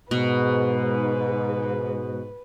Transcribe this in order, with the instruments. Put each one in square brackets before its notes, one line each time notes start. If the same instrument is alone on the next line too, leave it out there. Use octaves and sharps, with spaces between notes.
[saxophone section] G#2 [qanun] B2 [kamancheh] B4